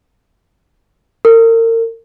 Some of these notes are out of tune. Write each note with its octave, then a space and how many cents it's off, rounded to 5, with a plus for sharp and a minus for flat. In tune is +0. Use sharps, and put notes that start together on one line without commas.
A#4 -35